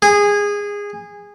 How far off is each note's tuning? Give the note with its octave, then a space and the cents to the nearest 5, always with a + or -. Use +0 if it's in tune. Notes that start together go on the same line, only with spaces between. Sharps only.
G#4 -20